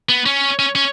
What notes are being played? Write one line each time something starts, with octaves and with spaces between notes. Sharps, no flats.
B3
C#4
C#4
C#4